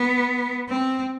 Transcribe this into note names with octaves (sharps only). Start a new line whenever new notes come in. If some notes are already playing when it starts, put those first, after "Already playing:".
Already playing: B3
C4